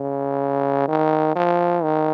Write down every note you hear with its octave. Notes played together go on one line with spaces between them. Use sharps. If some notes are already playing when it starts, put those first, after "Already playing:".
Already playing: C#3
D#3
F3
D#3